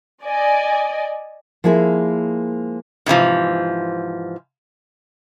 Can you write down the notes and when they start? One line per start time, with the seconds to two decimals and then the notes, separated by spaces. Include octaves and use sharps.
0.24 D5 D#5 G#5
1.64 F3 G#3 A#3 E4 G#4
3.06 G#2 C3 E3 F3